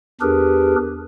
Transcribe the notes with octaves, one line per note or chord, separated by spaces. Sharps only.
E2 D4 G4 G#4 A#4 B4